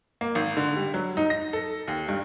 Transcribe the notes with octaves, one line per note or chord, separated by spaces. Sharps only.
A#3
G#1
D3
G3
F#3
D#4
A#6
A4
D#2
G2